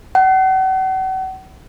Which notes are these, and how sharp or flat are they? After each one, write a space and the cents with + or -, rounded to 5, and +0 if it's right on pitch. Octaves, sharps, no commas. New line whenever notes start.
F#5 +40